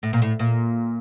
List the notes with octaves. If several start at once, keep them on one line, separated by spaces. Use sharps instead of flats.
A2
A#2
A2
A#2